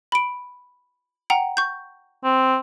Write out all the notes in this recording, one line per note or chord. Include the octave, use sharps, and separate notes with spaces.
B5 D7
F#5 G5 A#5
C#6 G6
C4